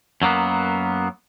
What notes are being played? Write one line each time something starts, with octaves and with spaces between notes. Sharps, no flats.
F#2 F#3 A#3 B3